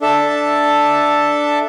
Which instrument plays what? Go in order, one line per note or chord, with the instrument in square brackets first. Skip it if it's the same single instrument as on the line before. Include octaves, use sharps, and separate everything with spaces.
[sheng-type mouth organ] D4 A4 E5 A5